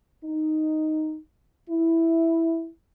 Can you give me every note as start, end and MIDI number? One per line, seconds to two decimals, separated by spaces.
0.24 1.18 63
1.70 2.68 64